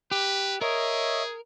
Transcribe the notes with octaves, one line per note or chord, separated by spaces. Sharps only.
G4 B4
G#4 A#4 C#5 D#5 E5